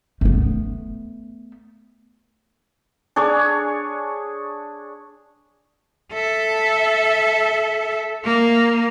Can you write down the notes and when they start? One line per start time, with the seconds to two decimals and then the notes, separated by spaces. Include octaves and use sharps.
0.21 A3 B3
3.16 D4 G#4 C#5
6.13 A4 E5
8.24 A#3